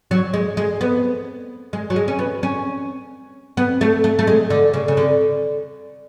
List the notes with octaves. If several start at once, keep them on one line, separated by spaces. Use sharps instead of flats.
F#3
G#3
G#3
B3
G#3
F#3
G#3
C#4
B3
C#4
B3
A3
A3
A3
G#3
D3
C#3
C#3
D3